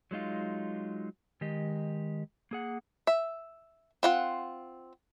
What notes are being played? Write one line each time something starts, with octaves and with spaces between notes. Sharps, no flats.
F#3 G#3 D#4 F4
D#3 G#3 G4 D#5
A#3 G#4 F#5
E5
C4 F4 F#5